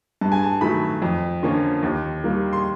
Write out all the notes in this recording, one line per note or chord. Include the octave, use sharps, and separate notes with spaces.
G2 A5
G#5
A5
D#3 F#3 A3 B5
F2
D3 F3 A#3 C#4
D#2
D#3 G3 A#3
C6